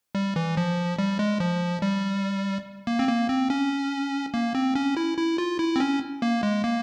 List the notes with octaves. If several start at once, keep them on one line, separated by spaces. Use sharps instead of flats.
G3
E3
F3
G3
G#3
F3
G3
A#3
C4
A#3
C4
C#4
A#3
C4
C#4
E4
E4
F4
E4
C4
C#4
A#3
G#3
A#3